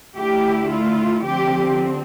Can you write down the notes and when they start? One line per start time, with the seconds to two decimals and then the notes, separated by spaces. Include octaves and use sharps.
0.16 D2 D3 A3 E4 G4
0.69 F4
1.23 D3 F3 C4 G4